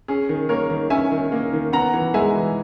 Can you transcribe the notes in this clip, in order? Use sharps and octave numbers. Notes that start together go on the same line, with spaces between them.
C#4 G#4
D#3
A#3 A#4 C#5
D#3
C#4 E5 G#5
D#3
A#3
D#3
B3 F#5 A#5
E3
G#3 E5 G#5
E3